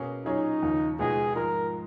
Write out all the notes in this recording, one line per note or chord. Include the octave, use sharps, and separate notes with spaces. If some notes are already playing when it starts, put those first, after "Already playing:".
Already playing: B2 A#3 C#4 G#4
A#2 F#3 C#4 D#4 G#4 C#5
D#2 C#3 F3
C#2 B2 G#3 D#4 F#4 G#4
G#2 F3 G#3 A#4